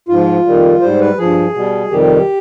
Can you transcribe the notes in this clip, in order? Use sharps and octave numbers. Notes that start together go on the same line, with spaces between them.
G#2 F3 F4
F2 D#3 G3
G#2 G3 C5
B4
G2 F3 G#4
B2 G3
F2 C3 D#3 G3 G4